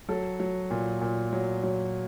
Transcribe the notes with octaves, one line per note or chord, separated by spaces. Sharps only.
F#3 A4
F#3
A#2
A#2
F#3
F#3